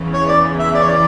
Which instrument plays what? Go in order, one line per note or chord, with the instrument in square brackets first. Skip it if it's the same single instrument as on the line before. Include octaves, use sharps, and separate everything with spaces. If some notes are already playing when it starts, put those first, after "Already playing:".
Already playing: [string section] E2 C#3 E3
[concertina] C#5
D5
E5
D5
C#5
D5